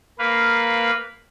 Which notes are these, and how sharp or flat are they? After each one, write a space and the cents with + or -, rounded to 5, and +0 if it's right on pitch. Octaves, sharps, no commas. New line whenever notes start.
A#3 -5 B4 +0 F5 +0